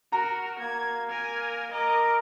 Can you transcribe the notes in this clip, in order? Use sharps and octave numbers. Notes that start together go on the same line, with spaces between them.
F#4 A#4 A#5
A#3 G#6
A#4 G#5
A#4 D#5 D6